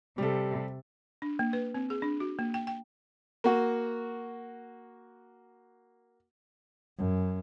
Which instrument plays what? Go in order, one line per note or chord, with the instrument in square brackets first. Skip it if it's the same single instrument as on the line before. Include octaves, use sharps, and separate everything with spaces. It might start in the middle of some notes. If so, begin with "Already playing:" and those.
[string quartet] C3 [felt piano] G3 A4
[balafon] D4
A#3
B4
C4
G#4
D4
F#4
A#3
G5
G5
[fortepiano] A#3 F#4
[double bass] F#2